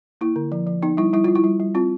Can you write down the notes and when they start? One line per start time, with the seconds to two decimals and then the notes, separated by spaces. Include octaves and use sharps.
0.21 A#3 E4
0.36 D3
0.52 F3
0.67 F3
0.82 B3 D#4
0.97 G3 E4
1.13 G3 E4
1.24 G3 F4
1.35 E4
1.44 G3
1.60 G3
1.75 C4 F4